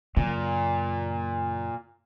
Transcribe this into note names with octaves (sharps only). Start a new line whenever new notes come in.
F#2 A#2 C#3